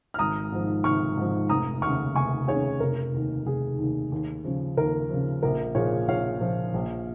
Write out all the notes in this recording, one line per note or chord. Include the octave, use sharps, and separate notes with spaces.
F6
G#1 A#5 D#6
G#2 F3
G#1 C#6 F6
G#2 F3
F1 A#5 D#6
D#2 C#3 C#6 F6
F1 G#5 C#6
D#2 C#3 G#4 C#5
F1 A#4
D#2 D#3
F1 G#4
D#2 D#3
D#2
C#3 F3
D#2 A#4
C#3 F3
A#1 A#4
A#2 F3 G#4 C#5
A#1 C#5 F5
A#2 F3
A#1